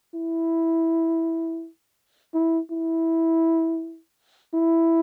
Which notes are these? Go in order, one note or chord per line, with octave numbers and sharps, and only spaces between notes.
E4
E4
E4
E4